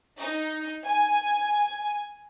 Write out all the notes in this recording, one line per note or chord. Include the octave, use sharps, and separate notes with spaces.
D#4
G#5